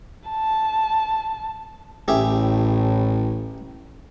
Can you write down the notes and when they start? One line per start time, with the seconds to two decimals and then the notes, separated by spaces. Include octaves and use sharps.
0.29 A5
2.08 A1 A2 G4 G#4 E5